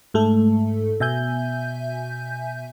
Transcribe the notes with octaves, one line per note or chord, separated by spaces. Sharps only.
G#2 A3 A4
B2 E5 G#5 G6